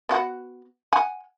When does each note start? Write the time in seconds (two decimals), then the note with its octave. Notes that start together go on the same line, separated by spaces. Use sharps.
0.09 B3 F#4 F#5
0.93 F#5 G#5